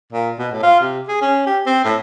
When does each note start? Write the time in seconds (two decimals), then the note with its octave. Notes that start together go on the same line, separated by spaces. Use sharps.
0.13 A#2
0.39 B2
0.52 A2
0.63 F4
0.81 C3
1.08 G#4
1.21 C#4
1.46 G4
1.66 C4
1.85 A2